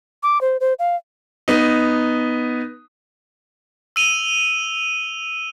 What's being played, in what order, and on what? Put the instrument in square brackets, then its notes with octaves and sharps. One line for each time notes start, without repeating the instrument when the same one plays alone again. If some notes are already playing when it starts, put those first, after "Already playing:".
[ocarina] D6
C5
C5
F5
[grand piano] B3 D#4
[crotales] E6 D#7 F7 G7